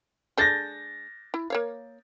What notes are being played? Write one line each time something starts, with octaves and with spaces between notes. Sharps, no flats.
G#3 D4 A4 G6 A6 A#6
E4
A#3 C#5 F5